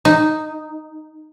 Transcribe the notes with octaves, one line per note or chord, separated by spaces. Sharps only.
D#4